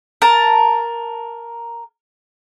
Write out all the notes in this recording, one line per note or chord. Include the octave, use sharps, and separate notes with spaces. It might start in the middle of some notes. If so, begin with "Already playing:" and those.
A#4 A5